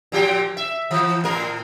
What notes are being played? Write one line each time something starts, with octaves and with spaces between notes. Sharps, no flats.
A#2 F3 G4
E5
E3
A2 A#4